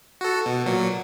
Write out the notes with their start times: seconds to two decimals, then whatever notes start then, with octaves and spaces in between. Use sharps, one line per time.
0.21 F#4 A4
0.46 B2
0.66 A#2 F#3